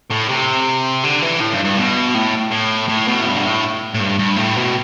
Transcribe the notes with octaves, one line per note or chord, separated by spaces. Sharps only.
A2
C3
D3
E3
A2
G2
G2
B2
A2
A2
A2
B2
A2
G2
B2
A2
A2
G2
G2
A2
B2